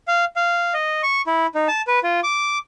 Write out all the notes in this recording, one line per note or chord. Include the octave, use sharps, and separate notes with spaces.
F5
F5
D#5
C#6
E4
D#4
A5
B4
F4
D6